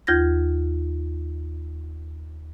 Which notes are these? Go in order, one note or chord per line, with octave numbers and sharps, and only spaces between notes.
D#2 F4 G6 G#6 A#6